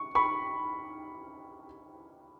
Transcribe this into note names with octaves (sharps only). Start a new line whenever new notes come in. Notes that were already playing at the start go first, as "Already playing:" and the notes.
Already playing: C#6
B5 C#6